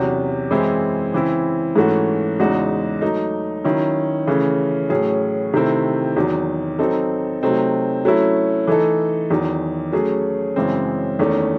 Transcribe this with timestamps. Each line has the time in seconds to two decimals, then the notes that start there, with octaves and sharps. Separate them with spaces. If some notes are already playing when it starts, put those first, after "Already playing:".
Already playing: E2 C3 F#3 C#4 F#4
0.51 F#2 E3 G#3 C4 E4
1.13 C#3 E3 C4 E4
1.76 G#2 E3 A3 C#4 F#4
2.39 E2 C#3 G#3 D#4 F#4
3.01 F#3 A3 D#4
3.64 D#3 F#3 C#4 E4
4.27 C#3 E3 A3 C#4 G#4
4.90 A2 F#3 C#4 G#4
5.53 C3 D#3 A3 C4 E4
6.16 E2 D#3 F#3
6.79 F#3 C4 D#4 A4
7.42 C3 F#3 A3 C4 D#4
8.05 F#3 A3 C#4 E4
8.67 E3 A3 D#4 A4
9.30 E2 D#3 F#3
9.92 F#3 A3 C#4 G#4
10.56 F#2 C#3 E3 G#3 C4
11.19 E2 D#3 A3 C#4